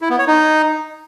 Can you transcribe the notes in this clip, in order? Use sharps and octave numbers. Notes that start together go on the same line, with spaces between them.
E4
B3
C#5
D#4